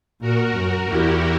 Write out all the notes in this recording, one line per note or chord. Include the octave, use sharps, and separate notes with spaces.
A#2 F#4 A#4
F#2
E2 E4 G4